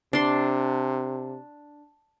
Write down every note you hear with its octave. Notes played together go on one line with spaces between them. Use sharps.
C3 D4 C6